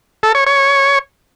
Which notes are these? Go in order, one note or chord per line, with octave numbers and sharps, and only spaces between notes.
A4
C#5
C#5